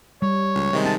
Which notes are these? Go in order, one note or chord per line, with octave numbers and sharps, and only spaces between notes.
G3 C#5
C#2
C3 D#3 G#3
D#4 A5